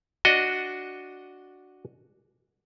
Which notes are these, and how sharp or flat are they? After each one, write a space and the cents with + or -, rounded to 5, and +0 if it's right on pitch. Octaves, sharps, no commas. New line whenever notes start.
D4 +0 F#4 +0 D#5 +5